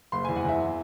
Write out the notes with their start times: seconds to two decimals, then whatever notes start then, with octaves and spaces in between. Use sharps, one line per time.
0.12 F#1 C6
0.25 E2 G#5
0.36 F#5
0.45 E2 E5